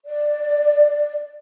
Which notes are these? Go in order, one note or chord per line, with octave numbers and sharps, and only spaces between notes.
D5